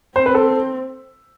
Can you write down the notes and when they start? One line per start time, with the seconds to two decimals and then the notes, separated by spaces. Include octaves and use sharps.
0.16 C4 C5
0.26 B4
0.35 A4